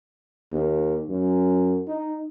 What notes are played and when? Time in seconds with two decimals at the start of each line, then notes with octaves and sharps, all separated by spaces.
0.52 D#2
1.09 F#2
1.88 D#4